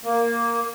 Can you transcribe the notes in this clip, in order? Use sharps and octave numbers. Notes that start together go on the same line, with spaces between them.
A#3